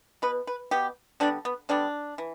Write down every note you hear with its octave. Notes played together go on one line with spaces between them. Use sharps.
B2 B3 B4
B4
B2 B3 G4
D3 G3 B3 D4
B3
D3 G3 B3 D4
E3